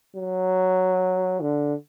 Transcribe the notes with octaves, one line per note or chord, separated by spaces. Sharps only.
F#3
D3